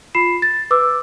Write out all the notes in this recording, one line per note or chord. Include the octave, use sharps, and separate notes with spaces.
F4 B5 C7 E7
A6
B4 D6 E6